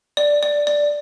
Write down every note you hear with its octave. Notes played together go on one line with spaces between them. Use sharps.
D5
D5
D5